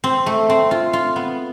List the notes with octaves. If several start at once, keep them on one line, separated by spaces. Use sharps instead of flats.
C4
A3
C4
F4
F4
B3